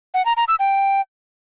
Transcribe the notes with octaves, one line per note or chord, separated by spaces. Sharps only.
F#5
A#5
A#5
E6
G5